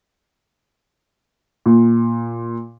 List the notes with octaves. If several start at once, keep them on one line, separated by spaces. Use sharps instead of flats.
A#2